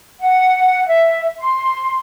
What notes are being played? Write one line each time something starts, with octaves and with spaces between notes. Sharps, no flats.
F#5
E5
C6